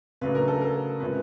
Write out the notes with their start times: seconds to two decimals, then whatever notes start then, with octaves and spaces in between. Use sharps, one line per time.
0.21 C#3 F#3 A3 D4 B4
0.35 A#4
0.48 A4
0.61 A#4
1.00 C3 F3 G#3 C#4 B4